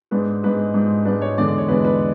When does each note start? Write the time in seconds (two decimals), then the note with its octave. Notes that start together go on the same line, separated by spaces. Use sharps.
0.11 G#2 G#3 D4 B4
0.43 G#2 G#3 D4 B4
0.74 G#2 G#3 D4
1.05 G#2 G#3 D4 B4
1.22 C#5
1.37 E2 D3 G#3 D4 D5
1.48 D5
1.58 C#5
1.68 E2 D3 G#3 D4 B4
1.84 B4